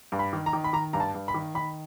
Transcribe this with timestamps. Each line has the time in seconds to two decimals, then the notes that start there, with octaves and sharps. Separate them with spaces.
0.12 G2
0.19 B5
0.33 D#3
0.46 A#5
0.53 D#3
0.64 B5
0.73 D#3 A#5
0.93 G2 A#5
1.00 A5
1.14 G2
1.28 B5
1.34 D#3
1.55 D#3 B5